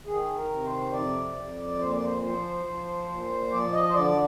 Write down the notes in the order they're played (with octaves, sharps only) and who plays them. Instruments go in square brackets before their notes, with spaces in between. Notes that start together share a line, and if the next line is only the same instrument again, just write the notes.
[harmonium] D#3 G#4
A#4
C3
C5
F2 D5
F2
A#2 C5
D5
C5
F3 C5
F3
A#2
F3 D5
D#5
C5
D3 D5